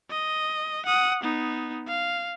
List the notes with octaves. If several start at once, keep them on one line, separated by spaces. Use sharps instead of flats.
D#5
F#5 D#6
B3 D#4
F5